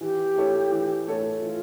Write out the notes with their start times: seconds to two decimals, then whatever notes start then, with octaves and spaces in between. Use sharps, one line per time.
0.01 E3 G4
0.36 A3 E4 A4 C#5
0.72 E3
1.07 A3 E4 A4 C#5
1.42 E3 F4